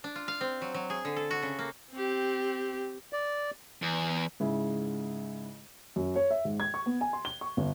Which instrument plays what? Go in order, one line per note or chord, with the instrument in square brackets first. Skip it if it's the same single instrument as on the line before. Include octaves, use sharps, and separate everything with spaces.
[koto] D4
F4
F5
C4
F#3
F#3
G#4
D3
A4
F#4
C#3
A#3
[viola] C4 G4
[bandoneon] D5
[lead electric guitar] E2
[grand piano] G#2 C#3 E4
[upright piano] F#2
C#5
E5
G#2
G#6
C#6
B3
G#5
C6
G7
C#6
G1